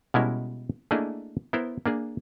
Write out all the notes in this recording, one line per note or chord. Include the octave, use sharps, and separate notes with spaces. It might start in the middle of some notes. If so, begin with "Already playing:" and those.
B2 G3 G#3 C#4 E4 A#4
A3 A#3 D4 E4 G#4 D#5
B3 E4 A#4 C5
A#3 D4 G#4